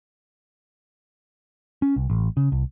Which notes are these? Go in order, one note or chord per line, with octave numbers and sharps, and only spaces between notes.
C#4
C2
A1
C#3
C2